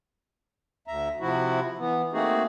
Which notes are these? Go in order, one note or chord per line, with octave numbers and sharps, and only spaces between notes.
D2 E5 A#5
C3 F3 E4 F#4
E3 B3
A3 A#3 C4 D#4 F#4 G#4